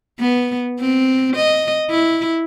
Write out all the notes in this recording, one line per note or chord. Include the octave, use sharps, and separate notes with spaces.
B3
C4
D#5
E4